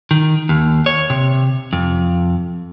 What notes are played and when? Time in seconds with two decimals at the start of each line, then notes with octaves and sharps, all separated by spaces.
0.11 D#3
0.49 D#2
0.86 C#5
1.10 C3
1.73 F2